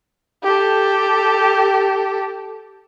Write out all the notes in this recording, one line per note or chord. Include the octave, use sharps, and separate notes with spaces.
G4 A4